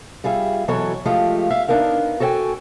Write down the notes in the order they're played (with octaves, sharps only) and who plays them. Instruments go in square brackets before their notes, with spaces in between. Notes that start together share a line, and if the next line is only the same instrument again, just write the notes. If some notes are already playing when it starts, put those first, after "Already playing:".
[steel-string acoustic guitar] G3 F4 G#4 E5
B2 E3 F#3 A4 C#5
F3 G#3 A3 F4 G4
E5 F5
B3 D4 D#4 A#4 F5
F#4 A4 C#5 D#5 G5 G#5